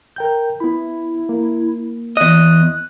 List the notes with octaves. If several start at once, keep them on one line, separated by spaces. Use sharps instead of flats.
A#4 G5 G6
B3 E4 B5
A#3
E2 D#5 F#6